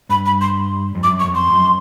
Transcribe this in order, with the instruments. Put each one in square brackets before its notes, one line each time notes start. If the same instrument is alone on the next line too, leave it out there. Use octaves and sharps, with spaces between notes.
[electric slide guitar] G2 [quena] B5
[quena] B5
C6
[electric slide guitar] F2
[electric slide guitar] F#2 [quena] D6
[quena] C#6
[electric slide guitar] F2
[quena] C6
[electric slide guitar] F#2